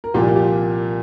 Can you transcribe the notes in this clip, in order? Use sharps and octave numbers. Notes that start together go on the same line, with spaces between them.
A#4
C2 A#2 F3 G4
G4